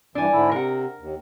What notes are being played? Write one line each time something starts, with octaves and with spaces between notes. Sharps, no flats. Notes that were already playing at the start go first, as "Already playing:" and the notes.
G2 E3 D4 G#5
G#2 D3 E4
C3 A#4 F#5
D#2